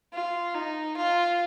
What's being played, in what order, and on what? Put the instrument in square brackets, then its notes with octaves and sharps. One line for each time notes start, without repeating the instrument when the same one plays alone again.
[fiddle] F4
D#4
F4